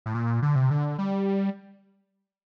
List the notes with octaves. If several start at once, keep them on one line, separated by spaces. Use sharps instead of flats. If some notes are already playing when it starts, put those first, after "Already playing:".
A2
A#2
D3
C3
D3
G3